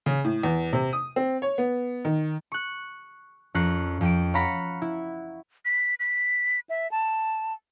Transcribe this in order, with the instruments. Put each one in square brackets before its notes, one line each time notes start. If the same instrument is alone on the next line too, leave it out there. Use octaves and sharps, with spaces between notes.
[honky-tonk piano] C#3
A2
E2
C3
D#6
C4
C#5
B3
D#3
[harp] C#6 F#6
F2 C#4 A#4 C#6 F#6 C7
F2 G5 D7
C#5 F5 F#5 A#5 B5 C#6
E4
[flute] B6
B6
E5
A5